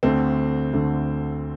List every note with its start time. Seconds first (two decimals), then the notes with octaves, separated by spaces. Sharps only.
0.03 D2 D3 A3 C4
0.73 D2 D3 A3